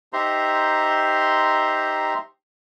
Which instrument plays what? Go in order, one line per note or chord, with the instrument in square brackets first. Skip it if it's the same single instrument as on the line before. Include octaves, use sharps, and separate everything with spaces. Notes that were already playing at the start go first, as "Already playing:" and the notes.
[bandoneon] D#4 G4 C5 E5 A#5 C6